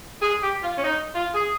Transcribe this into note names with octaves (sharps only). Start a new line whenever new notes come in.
G#4
G4
F4
C#4
D#4
F4
G#4